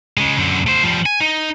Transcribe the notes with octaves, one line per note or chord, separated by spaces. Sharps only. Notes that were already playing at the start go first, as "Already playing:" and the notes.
C#3 G#3
F#2 D3
A3 C5
F3 G3
G#5
D#4